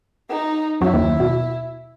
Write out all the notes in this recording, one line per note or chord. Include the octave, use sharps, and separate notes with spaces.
D#4
F#2 F#3 E4
D#2 D#3
B2